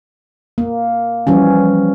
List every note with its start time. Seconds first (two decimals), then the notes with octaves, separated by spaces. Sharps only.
0.58 A#3
1.27 E3 F3 G3 C#4